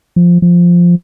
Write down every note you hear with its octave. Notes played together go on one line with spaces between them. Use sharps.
F3
F3